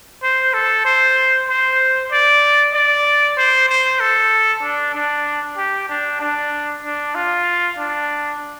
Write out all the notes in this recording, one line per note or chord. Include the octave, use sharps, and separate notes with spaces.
C5
A4
C5
C5
D5
D5
C5
C5
A4
D4
D4
G4
D4
D4
D4
F4
D4